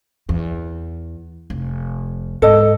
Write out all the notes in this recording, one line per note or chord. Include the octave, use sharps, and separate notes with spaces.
E2
F1
G#2 A4 D#5